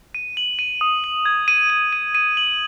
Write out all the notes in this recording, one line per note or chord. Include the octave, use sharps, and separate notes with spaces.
D#7
F#7
D#7
D#6
F#7
G#6
D#7
D#7
D#7
D#7
F#7